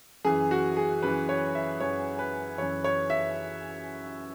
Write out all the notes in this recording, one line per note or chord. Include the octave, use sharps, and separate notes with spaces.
F#2 E3 G#4
F#4
G#4
F#2 E3 B4
C#5
E5
F#2 E3 C#5
B4
F#2 E3 C#5
C#5
E5